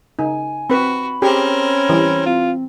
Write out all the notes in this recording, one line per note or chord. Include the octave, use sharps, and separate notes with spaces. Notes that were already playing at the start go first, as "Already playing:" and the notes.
C#3 D#4 G#5
C4 F#4 B4 B5
C4 C#4 G4 G#4 A#4
E3 G3
C4 F4